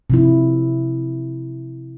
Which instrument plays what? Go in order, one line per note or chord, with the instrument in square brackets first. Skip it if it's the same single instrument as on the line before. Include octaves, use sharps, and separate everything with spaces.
[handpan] C3 F3 E4